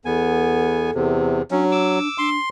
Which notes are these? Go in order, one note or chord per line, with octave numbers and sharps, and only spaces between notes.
E2 B3 A4 G#5
E2 C3
F#3 C#4 D4
D6 E6
D4 C6